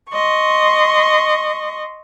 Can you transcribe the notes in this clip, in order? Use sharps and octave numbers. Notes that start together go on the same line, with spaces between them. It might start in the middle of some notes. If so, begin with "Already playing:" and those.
D#5 C6 C#6